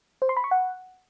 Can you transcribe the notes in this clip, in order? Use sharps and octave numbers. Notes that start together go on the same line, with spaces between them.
C5
C6
B5
C#6
F#5